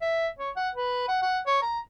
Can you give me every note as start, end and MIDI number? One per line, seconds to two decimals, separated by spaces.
0.02 0.28 76
0.39 0.50 73
0.56 0.69 78
0.75 1.05 71
1.08 1.19 78
1.22 1.39 78
1.47 1.59 73
1.62 1.80 82